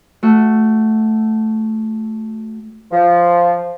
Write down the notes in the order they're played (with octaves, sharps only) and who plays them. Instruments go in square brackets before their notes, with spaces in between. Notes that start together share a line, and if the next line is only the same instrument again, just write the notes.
[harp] A3 F#4
[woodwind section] F3